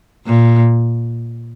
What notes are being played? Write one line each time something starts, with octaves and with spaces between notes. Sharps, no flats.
A#2